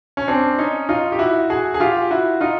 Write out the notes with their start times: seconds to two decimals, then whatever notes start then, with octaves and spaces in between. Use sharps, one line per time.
0.17 C#4
0.28 C4 D4
0.58 C#4 D#4
0.89 D#4 F4
1.12 G4
1.19 E4 F#4
1.50 F#4 G#4
1.74 G#4
1.80 F4 G4
2.11 E4 F#4
2.41 D#4 F4